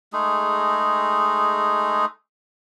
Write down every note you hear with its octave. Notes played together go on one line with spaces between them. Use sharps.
G#3 A3 D#4 G#4